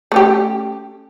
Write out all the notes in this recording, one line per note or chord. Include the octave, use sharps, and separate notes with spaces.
A3 C#4 G4